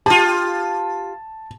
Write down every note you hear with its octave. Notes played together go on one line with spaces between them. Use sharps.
F4 G4 A5